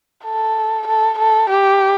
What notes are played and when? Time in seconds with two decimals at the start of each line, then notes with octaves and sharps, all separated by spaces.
0.24 A4
0.87 A4
1.18 A4
1.49 G4